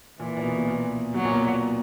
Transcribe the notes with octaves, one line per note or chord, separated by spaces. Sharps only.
A#2 E3
A#2
B2
B2
A#2
B2 F#3
A#2
B2